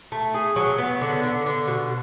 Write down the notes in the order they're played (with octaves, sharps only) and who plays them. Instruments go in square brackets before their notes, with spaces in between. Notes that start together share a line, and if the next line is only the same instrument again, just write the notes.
[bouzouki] A3
G#4
F#3
B3
D3
D3
D3
B2